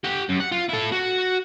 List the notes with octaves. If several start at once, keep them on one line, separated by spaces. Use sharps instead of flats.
G4 F#5
F#2
F#5
F4
E4 A4
F#4